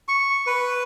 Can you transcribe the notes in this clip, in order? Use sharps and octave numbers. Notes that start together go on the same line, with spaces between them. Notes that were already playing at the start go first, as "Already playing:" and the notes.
C#6
B4